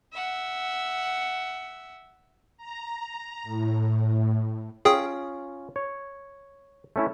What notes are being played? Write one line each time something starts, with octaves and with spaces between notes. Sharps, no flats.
E5 F#5
A#5
A2
C#4 F4 G#4 G5 D#6
C#5
A3 C#4 E4